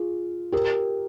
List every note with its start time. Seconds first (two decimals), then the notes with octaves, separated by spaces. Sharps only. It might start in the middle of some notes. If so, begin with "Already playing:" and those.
Already playing: F4 G#4
0.52 G4 A#4